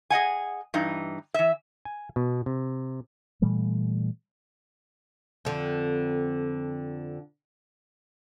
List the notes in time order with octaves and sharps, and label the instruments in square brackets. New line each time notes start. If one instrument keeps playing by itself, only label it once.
[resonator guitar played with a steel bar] G#4 D#5 F#5 G#5
G2 E3 D#4
E3 E5
[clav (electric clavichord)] G#5
B2
C3
[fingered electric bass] A#2 E3 G3 A3
[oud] F2 D3